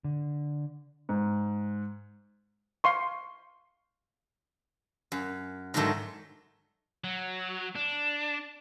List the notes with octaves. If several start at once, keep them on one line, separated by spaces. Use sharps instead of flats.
D3
G#2
F5 C6 C#6
F#2
G#2 D3 D#3 F#3 A3
F#3
D4